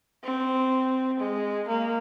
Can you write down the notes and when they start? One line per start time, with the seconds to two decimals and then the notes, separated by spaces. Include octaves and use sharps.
0.24 C4
1.20 G#3
1.68 A#3